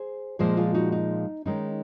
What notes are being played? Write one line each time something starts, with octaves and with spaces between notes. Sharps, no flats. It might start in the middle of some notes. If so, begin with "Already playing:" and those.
Already playing: G#4 C5
A#2 F3 G#3 G#4 C5
F4 G#4
D#4 F#4
D#4
D#3 G#3 C#4 D#4